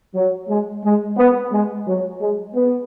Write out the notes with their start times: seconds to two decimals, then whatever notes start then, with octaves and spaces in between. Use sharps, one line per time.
0.15 F#3
0.48 G#3
0.84 G#3
1.17 B3
1.51 G#3
1.86 F#3
2.20 G#3
2.54 B3